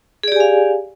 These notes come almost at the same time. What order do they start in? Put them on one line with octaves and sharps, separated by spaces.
G#4 D5 G4 G#5 F5